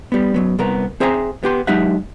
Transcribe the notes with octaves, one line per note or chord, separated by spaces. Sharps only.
G3 B3
F#2 F#3 B3
C2 B3 A#4
C4 G#4 C5 E5 G5 A#5
B3 G4 C6
F#3 G#3 D#4 G4 E5 F#5